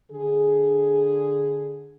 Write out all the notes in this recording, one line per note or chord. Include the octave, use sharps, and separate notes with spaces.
D3 G#4